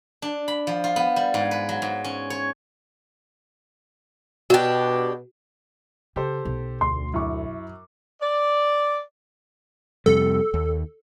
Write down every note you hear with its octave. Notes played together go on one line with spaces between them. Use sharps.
D4
B5
F3
F4
B3
G3
G#2
B4
F#3
G#2
C#4
C#5
B2 D4 F#4 G4
C#3 G4 A4 C5
B1
D2 C6
F#2 E4 C#6 D6
D5
F2 C3 G3 A4
D#2